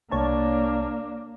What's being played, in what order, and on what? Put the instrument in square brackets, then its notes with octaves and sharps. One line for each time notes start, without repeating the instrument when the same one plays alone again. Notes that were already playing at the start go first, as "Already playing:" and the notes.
[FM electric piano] C2 C#5 A5 [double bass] A#3 D4